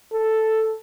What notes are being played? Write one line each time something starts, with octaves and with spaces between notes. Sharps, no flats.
A4